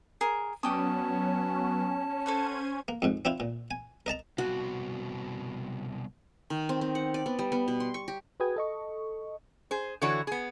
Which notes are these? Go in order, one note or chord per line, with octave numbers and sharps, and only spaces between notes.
G#4 A#4
F#3 B3 C#4 D5 G5 A5 D#6
A4 C5 C#5 F#5 G#6 D#7
A#3
F2 G#2
C4 D4 E4 F4
A#2
G#5
A#4 D#5 A5 A#5
C2 B2 F#4
D#3
C4
C4
F#5
D5
B3
G3
B3
B2
C6
C#6
G4
F#4 G#4 B4 G5 D#6 G#6
A4 D#5 C#6
G#4 C5
D3 E3 E4 F#4 A4 C#5
B3 G#4